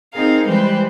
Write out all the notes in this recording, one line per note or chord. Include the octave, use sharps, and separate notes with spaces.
C4 D#4 G#4 A#4 F5
E3 G3 G#3 G4 B4 C5